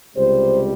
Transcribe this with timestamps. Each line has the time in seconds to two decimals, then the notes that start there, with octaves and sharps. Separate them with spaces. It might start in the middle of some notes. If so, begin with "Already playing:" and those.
0.16 C#2 C3 G3 C5